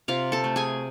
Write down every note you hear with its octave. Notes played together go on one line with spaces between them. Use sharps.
C3 F4 F5
A4 A5
A3
G#4 G#5